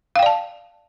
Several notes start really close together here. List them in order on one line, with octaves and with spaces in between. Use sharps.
F5 G5 D5 A5